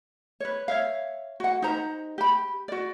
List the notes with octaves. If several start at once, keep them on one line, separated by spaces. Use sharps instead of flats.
B4 C#5
C#5 E5 F5
F#4 F#5
D#4 G4 C5 A#5
G4 B5
F#4 D5